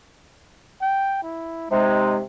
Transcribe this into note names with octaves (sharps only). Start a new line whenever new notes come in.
G5
E4
C3 G#3 D#4